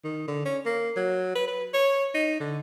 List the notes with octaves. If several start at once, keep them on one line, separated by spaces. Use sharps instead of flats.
D#3
D3
C#4
A#3
F#3
B4
B4
C#5
D#4
D3